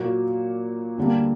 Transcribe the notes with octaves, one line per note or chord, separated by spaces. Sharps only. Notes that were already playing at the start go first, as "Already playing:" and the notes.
Already playing: A#2 F#3 A#3 F#4
D2 D3 G3 A#3